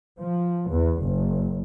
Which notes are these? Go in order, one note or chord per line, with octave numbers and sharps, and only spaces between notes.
F3
E2
F#1